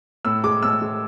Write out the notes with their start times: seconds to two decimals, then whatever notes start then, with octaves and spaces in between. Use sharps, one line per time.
0.25 A2 E6
0.44 G#3 D6
0.63 A2 E6
0.82 G#3